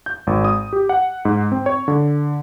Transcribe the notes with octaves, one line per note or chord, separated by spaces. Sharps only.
G6
G#1
D#6
G4
F#5
G#2
C4
C#5
D3